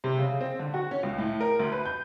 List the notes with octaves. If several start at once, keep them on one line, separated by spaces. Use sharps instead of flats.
C3
C#3
C4
D3
F#4
C#4
C#2
A2
A#4
D2
B4
G6